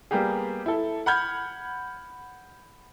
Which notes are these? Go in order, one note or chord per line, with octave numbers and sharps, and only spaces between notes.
G3 A#3 B3 G4 G#4
E4 A4
F#5 B5 F6 G6 G#6